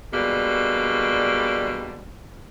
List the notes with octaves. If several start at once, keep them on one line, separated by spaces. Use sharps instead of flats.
B2 D3 G3 G#3 A#3